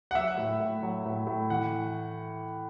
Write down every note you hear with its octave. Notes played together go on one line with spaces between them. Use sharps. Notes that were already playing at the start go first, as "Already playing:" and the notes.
F#5
F#3 E5
A2
A2
F#3
A2
A2
E3 F#5